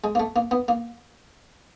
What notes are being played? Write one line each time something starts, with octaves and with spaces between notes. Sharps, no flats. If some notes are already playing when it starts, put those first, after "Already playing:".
G#3
A#3
A3
A#3
B3
A#3